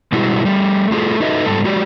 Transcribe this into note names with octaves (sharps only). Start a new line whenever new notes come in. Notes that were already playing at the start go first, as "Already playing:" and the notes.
B2 G3 G#3 E4 F#4
G3 A3
A3 F4 F#4 G#4 A4
D#4 F#4 A4 B4 D#5 E5
G#2 G3 A4
G#3 F#4 G4 D5